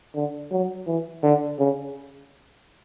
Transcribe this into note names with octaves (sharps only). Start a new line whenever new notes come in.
D3
F#3
E3
D3
C#3